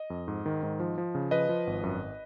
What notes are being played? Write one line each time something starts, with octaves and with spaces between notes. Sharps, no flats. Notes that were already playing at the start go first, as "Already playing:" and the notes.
Already playing: D#5
F2
G#2
D#3
G#2
F3
F3
C#3
F3 B4 D#5
F3
G#1
F#2